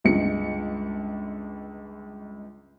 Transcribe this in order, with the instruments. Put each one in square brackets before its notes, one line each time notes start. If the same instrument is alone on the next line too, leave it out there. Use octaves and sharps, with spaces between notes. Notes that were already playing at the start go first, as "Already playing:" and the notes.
[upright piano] G1 C#2 G#3 C#7